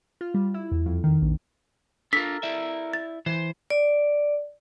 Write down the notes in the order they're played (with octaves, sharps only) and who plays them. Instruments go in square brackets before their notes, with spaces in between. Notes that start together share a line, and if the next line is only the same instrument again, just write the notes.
[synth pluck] F4
G3
E4
E2
F2
D#3
A#1
[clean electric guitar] D4 F4 [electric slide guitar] A4 A#4 [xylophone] B6
[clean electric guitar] E4 D5 E5
[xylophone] A6
[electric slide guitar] E3 [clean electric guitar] C5
[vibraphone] D5